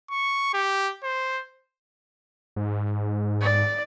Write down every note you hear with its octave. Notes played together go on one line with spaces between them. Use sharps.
C#6
G4
C5
G#2
D5